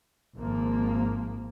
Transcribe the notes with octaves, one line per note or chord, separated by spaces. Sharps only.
G#1 F3 A#3